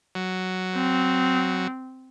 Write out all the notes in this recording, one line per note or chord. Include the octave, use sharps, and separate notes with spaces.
F#3
C4